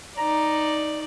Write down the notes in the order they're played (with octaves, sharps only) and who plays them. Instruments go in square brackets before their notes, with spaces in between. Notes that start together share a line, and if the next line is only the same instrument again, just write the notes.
[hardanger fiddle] D#4 D5 [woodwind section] A#5